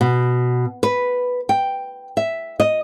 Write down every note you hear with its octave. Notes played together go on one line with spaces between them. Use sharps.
B2
B4
G5
E5
D#5